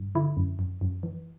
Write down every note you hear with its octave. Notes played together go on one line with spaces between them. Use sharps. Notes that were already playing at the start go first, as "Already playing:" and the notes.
Already playing: G2
D3 E4
F#2
F#2
F#2
E3